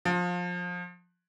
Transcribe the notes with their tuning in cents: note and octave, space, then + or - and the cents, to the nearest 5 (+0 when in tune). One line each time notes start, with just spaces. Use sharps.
F3 +20